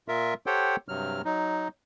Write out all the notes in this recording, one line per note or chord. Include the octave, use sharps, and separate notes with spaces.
A#2 F4 A#4 E5
G4 A4 C5 C#5 F#5 G5
G2 C3 F#3 F6
F#3 D#4